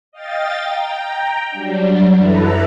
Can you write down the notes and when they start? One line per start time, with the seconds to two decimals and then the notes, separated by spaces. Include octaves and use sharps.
0.12 D#5 F5 G5 A6
0.66 G5 A#5
1.51 F#3 G3 D4
2.13 F#2 E3 E4 A4 B4 A#5